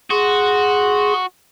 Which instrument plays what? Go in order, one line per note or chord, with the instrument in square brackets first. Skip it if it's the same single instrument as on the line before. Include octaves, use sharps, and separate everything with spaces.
[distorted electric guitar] F#4 [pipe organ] G#4 C6